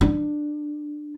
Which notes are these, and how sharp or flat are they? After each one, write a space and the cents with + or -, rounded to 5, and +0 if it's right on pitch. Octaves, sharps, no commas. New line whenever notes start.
D4 +15